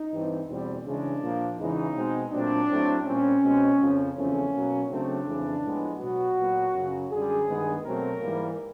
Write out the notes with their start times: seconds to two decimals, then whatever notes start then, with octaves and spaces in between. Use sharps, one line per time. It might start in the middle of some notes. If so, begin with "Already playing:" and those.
Already playing: D#4
0.11 G2 E3 G3 C4
0.48 E2 B2 G3 C4
0.85 C#3 E3 G#3 D4
1.21 A#2 F3 A#3
1.58 E2 C#3 E3 G#3 D#4
1.95 B2 G#3 C4
2.32 A#2 F#3 A3 C4 D4
2.68 A2 F#3 A3 C4
3.05 A#2 G3 C4 C#4
3.42 B2 G#3 C4
3.79 F2 C#3 F3
4.16 E2 C#3 F3 A3 C4 C#4
4.52 B2 F#3 A#3
4.89 C#3 F#3 A3 C4 D4
5.26 F2 C#3 E3 G#3
5.63 A2 F3 G#3 B3
5.99 B2 F#3 B3 F#4
6.37 A#2 F#3 B3
6.74 F#2 C#3 F#3
7.11 F#2 D3 G3 G#4
7.47 G2 D#3 G#3 B3
7.84 B2 F#3 A3 C4 A#4
8.21 G#2 E3 G3 A#3